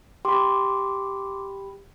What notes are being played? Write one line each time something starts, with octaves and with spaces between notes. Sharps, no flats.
G4 B5 C6 D6